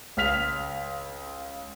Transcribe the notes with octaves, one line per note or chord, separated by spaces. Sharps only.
C#2 F5 F6 B6 F7